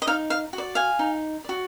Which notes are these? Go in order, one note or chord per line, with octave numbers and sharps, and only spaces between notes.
D#5
D#4 F5
F5
F#4
D5
F5 G#5
D#4
F#4 D5